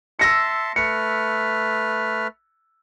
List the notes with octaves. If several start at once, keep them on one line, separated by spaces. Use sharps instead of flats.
E5 A5 C6 E6 A#6 C#7
A3 B4 F6 C#7